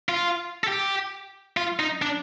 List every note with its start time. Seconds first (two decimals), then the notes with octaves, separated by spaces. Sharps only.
0.09 F4
0.64 A4
0.68 G4
1.57 F4
1.79 D#4
2.02 D4